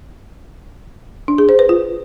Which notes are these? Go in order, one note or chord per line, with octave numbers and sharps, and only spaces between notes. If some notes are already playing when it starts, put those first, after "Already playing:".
D4
G#4
C5
B4
F4